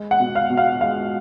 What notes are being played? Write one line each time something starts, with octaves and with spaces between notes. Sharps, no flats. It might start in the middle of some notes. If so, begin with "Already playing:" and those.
Already playing: G#3
F#5
B2
F5
B2
F5
G#3 F5